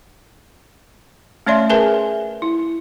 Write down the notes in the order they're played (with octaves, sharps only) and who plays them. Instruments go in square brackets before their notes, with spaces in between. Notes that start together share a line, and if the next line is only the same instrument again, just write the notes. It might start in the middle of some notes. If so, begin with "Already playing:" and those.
[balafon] A3 C#4 C#5 D5 E5 C6
G#4 A#4 B4 E5 G#5 A5
E4